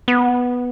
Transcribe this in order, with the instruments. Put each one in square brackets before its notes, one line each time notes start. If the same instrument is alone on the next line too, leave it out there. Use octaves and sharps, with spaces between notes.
[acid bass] B3